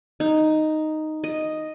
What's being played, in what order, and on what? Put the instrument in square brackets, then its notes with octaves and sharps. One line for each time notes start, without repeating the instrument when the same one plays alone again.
[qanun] D#4
D#5